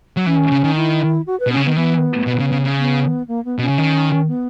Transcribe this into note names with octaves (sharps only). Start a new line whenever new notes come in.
F#3
E3 C#4
C#3
D#3
E4
F#4
B4
B2
C#3 C#4
D#3 B3
E3 B3
B2
C#3
C#3
C#3
B3
A#3
B3
B2 C#4
C#3
D#3
B3